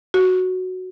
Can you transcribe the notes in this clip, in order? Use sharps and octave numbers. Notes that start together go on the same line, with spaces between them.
F#4